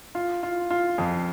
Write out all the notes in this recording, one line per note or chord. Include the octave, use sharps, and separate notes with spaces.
F4
F4
F4
F2